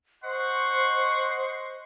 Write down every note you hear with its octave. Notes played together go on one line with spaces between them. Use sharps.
C5 D#5 F#5 C6 C#6